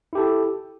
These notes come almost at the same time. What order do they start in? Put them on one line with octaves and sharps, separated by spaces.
E4 G4 A4